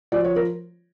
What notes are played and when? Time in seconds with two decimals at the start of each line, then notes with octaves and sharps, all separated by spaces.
0.12 F3 D5
0.24 C#5
0.36 A#4